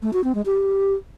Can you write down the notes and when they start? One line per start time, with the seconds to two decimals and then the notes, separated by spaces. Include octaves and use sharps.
0.02 A3
0.13 F#4
0.24 C4
0.35 G#3
0.46 G4